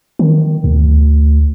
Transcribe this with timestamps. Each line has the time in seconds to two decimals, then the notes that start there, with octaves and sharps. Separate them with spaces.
0.19 D#3
0.64 D2